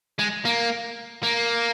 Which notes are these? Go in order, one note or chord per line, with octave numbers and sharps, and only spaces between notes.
G#3
A#3
A#3